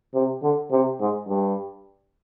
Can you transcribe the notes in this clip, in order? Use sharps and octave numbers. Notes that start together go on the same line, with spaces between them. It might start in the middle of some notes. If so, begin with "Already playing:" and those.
C3
D3
C3
G#2
G2